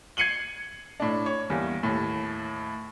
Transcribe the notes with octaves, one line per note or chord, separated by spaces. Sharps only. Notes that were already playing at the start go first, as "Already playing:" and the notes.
G#6 C7 C#7 D#7 F#7 G7
A2 D4
C#5
E2 G3 A#3
D#2 A2